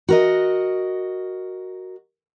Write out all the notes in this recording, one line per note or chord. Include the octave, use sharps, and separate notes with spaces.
F#4 A#4 D#5